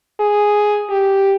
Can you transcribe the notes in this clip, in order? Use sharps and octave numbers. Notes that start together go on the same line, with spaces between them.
G#4
G4